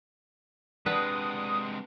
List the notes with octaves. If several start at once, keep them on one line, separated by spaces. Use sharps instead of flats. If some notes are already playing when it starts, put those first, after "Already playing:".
C3 G#3 D4 B4 F#5 A5 D#6